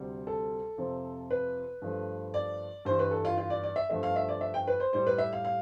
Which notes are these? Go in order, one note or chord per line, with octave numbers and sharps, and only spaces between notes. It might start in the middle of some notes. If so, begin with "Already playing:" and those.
Already playing: D2 C3 G3
A4
F2 C3 F3
B4
G2 F3 A3
D5
G2 E3 G3 C5
B4
A4
F4
F4
D5
D5
E5
G2 F3 A3 E5
F5
E5
D5
E5
G5
B4
C5
A2 G3 C5
B4
E5
F5
F5